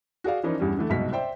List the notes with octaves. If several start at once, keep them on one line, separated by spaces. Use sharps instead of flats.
F#4 G#4 D5 F5
E3 F3 C#4 D#4 A#4 D5
E2 G2 G3 C#4
D3 E3 A3
C2 G#2 B2 F#3 B6
C5 D5 E5 G5